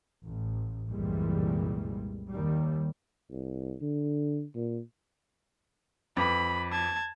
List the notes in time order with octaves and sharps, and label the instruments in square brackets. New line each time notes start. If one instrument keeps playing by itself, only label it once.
[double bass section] A1
C2 F#2 A#2 E3 G3 G#3
D#2 G3
[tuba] C2
D3
A#2
[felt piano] F2 B4 D6 [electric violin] B5
[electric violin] A5 G#6